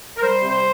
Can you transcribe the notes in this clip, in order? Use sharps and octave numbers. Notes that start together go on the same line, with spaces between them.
A#4
G3 C5
C3
C5